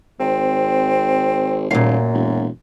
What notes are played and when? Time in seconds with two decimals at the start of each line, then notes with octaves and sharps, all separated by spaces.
0.20 G#1 C4
1.71 D#1 F#2 A#2 F5
2.13 E1